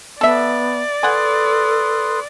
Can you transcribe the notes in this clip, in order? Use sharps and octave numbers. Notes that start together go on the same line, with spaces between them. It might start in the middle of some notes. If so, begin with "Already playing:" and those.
B3 A4 D5 E5
A4 B4 F#5 G#5 C6 D#6